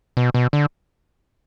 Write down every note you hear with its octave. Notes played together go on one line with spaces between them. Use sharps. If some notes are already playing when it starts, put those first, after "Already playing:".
B2
B2
D3